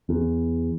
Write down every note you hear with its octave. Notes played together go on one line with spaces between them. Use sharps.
E2